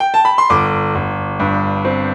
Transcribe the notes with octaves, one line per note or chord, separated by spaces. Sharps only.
G5
A5
B5
C6
G1 D6
G1
G2
C4